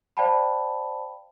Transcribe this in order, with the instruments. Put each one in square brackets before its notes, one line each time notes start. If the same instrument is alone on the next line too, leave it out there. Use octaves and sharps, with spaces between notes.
[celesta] C5 D5 F5 G5 A5 B5